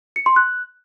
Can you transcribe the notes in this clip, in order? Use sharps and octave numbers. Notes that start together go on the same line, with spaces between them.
C#7
C6
F#6